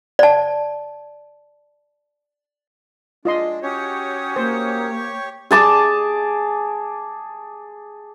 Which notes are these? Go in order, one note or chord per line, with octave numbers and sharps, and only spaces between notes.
D5 A5
G#3 D4 F4 D#5 C6
C#4 F#4 G4 C#5 D#6
A#3 C5
C#6
G#4 A5 D6